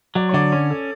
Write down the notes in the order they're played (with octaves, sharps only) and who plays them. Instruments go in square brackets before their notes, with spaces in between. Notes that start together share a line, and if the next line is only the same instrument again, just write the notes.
[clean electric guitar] F#3 [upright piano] D5
[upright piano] C#5
[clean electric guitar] D3 [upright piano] D5
[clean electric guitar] C#4 [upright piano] C#5
[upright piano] A4